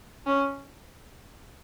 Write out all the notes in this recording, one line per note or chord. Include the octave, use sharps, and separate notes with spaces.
C#4